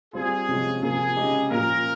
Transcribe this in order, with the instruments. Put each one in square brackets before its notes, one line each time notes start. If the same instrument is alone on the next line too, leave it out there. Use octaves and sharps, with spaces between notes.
[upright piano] G3 C4 F4 [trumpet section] G#4
[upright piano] C3 F3 G#3 C#4
[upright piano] C3 F3 A#3 [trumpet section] G#4
[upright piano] C#3 G#3 D#4 G4
[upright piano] A#2 F3 A#3 F4 [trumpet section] A#4